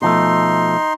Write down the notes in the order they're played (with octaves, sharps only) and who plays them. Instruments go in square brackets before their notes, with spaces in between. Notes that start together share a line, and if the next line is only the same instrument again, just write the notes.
[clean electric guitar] B2 F3 A3 [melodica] D#4 C6